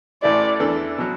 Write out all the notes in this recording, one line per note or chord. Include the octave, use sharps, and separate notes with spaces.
A1 A2 E3 A3 E4 D5
E2 E3 D4 A4
B2 F#3